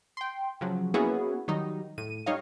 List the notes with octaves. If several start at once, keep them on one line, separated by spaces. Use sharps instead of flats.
G5 C6
C#3 F3 F#3
A#3 B3 C#4 E4 F#4 G#4
D#3 F#3 G3 D#4
A2 D#7
G3 D#4 C#5 D#5 F5